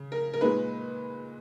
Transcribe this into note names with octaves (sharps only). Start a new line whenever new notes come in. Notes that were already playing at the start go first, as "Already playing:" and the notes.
Already playing: C#3
A#4
A#4
A#2 G#3 D#4 B4